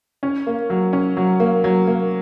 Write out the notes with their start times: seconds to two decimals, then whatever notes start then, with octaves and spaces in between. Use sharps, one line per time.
0.23 C#4
0.47 A#3
0.70 F#3
0.93 C#4
1.17 F#3
1.40 A#3
1.64 F#3
1.87 A#3